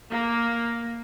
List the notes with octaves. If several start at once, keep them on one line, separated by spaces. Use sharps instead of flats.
A#3